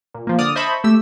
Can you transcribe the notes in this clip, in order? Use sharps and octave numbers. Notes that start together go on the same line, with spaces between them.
A#2
F3 A#3
D3 D5 D#6 F6
C5 D#5 E5 A5 B5 C#6
A3 G4 E6